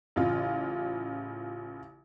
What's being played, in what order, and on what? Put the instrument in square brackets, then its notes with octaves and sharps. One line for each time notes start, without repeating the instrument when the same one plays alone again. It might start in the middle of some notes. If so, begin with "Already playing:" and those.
[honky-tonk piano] A1 C#3 F4